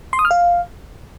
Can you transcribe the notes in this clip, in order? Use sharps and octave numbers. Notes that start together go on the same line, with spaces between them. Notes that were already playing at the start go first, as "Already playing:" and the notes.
C6
D#6
F6
F5